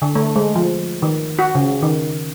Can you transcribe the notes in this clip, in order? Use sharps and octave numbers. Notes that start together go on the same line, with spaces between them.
D3
A3
G#3
F3
D#3
F#4
C#3
D#3